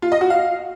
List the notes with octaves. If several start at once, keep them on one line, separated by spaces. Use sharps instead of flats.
F4
D#5
F#4
F5